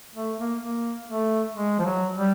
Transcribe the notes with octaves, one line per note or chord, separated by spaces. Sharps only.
A3
A#3
A#3
A3
G#3
F3
F#3
G3